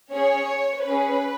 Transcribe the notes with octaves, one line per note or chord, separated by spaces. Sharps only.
C#4 G#4 C#5
C#4 G#4 B4